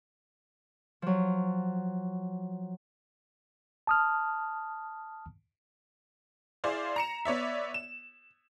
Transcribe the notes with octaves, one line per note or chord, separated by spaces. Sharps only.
F3 F#3
A5 D#6 F6
E4 G#4 C5 D5 F5
A#5 C#7 E7
B3 C#5 D5 E5
E7